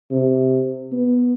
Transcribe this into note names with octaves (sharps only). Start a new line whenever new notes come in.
C3
B3